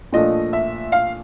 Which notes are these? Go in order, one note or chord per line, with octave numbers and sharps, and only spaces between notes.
A#2 F3 A3 D4 D#5
E5
F5